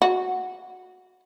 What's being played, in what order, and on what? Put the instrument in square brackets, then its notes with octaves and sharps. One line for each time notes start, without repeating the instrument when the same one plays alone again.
[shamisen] F#4